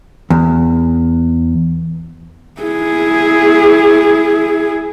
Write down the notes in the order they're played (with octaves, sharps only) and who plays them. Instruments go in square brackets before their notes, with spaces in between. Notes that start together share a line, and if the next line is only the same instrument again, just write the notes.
[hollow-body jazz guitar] E2
[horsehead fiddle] E4 G#4